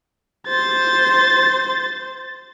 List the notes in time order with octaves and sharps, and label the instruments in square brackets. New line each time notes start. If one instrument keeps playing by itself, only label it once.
[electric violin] C5 A6